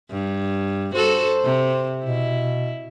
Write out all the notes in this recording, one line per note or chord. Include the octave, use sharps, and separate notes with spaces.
G2
F#4 A4 C5
C3
B2 E4